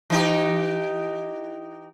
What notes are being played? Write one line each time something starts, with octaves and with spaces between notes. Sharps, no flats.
E3 D#4 G4